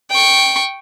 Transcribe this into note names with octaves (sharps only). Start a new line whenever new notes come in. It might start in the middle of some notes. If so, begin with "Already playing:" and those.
G5 C#6